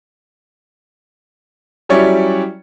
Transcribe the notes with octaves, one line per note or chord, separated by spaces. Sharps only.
F#3 G3 C#4 E4 C#5 D5